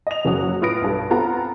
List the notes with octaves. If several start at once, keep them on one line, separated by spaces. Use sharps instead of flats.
D#5 F7
F#1 C#3 F#3 F#4 D#6
A2 F4 B4 D#6 A#6 D7
B1 G2 A4
B3 C4 F4 A4 F#5 A#5